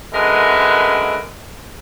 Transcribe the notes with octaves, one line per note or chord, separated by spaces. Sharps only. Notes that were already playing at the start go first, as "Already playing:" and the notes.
F#2 D3 G#3 A#4 B4 E5